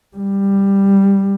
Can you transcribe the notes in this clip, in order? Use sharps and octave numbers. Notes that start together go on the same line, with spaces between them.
G3